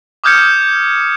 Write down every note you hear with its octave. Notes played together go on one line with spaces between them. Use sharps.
D6 D#6 F6 G6 G#6 C#7